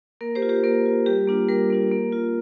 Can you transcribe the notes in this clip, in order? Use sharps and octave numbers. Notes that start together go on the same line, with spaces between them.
A#3 A#4
G4 C5
F4
G4 C5
A#3 A#4
F4
G3 G4
A#3 D4 F4
G3 A#4
A#3 D4 F4
A#3
F4